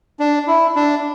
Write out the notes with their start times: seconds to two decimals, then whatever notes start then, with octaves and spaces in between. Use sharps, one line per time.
0.19 D4
0.47 E4
0.76 D4